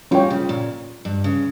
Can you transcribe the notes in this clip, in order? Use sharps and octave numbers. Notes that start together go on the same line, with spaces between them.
G3 A#3 C#4 F4 C#5 G5
C#3
A#2
G2
C#3